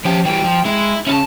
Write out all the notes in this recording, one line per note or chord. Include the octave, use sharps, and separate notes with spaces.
F3 C#4 G4
E3 G3 G5
F3
G#3 E4
C#3 C#4 E4 A5